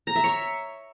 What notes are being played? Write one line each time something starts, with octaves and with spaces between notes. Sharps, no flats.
A#5
E5
C#5